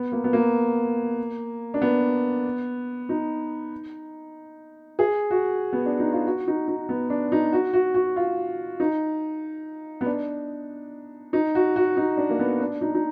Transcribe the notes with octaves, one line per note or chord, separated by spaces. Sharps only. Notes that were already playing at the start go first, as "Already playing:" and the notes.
Already playing: B3
A#3
B3
A#3
D4
B3
D#4
G#4
F#4
B3
D4
D#4
F4
F#4
D#4
D#4
B3
D4
D#4
F#4
F#4
F#4
F4
D#4
B3
D4
D#4
F#4
F#4
D#4
D4
A#3
B3
D4
D#4
D#4